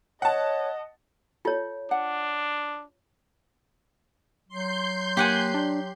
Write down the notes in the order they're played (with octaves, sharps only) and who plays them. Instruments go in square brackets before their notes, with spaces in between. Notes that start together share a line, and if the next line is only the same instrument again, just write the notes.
[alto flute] C#5 [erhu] D#5 [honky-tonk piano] F#5 A5
[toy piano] F4 C#5 [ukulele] A4
[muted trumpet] D4 [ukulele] F#5
[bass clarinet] F#3 [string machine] C6 G6
[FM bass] A#3 [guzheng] G4 F#5 G#5
[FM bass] D4